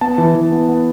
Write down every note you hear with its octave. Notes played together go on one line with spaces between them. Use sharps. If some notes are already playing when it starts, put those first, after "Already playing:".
B3 A5
E3
E3
B3
B3